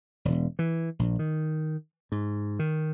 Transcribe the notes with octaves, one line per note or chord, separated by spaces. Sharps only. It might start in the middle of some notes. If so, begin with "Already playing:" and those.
E1
E3
A#1
D#3
G#2
D#3